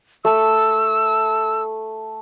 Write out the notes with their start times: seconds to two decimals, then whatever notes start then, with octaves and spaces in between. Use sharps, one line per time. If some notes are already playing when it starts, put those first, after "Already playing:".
0.25 A3 E6